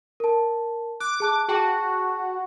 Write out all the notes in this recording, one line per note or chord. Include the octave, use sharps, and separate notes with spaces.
A#4 A5
D6 F#6
G#4 A5 F#6
F#4 G#4 G5 A5